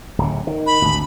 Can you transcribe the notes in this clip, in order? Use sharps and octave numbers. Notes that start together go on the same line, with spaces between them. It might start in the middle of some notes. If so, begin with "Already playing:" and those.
D1 C#3
D#3
B5
G#1 D2